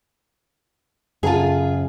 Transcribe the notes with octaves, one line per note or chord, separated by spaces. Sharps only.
F#2 C#3 F4 G#4